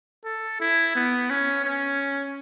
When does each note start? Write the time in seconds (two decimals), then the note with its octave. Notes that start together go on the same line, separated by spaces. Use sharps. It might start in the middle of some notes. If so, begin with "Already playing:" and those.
0.25 A4
0.60 E4
0.95 B3
1.30 C#4
1.65 C#4